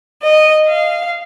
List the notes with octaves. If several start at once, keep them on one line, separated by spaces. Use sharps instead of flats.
D#5
F5